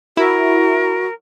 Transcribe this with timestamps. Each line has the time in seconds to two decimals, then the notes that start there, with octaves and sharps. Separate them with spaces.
0.17 E4 F#4 A#4